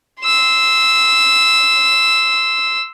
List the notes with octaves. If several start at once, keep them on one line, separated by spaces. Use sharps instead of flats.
C6 E6